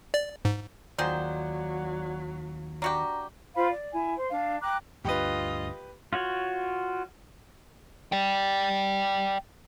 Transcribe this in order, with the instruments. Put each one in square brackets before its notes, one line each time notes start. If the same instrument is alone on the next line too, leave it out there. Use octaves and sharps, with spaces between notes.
[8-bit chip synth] D5
G#2
[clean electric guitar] D#2 F4 [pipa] D#3 G#4 C5 [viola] F#3 [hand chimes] D5 F#5
[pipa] D4 F#4 G4 [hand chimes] A#5
[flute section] F4 C5 F5 B5
D5
E4 G#5
C5
D4 F5
G5 A#5 D6 F#6
[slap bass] D2 G2 [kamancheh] F4 D#5 [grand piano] G4 B4
[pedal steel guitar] F4 F#4 C#5
[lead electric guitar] D5 G5